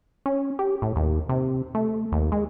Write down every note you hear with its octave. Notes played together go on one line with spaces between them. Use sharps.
C#4
G4
A2
D#2
C3
A3
D#2
G#3